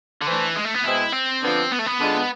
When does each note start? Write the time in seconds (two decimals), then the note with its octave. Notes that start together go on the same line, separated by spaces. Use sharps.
0.22 D3
0.27 E3 A3 D4 A4 C5
0.56 G#3
0.65 A3
0.75 B3
0.84 B2 G#3 C4 E4 G#4 C5
1.13 C4
1.42 D3 F3 B3 D4
1.72 B3
1.79 A3
1.86 B3
2.00 D3 G#3 D4 F4 G#4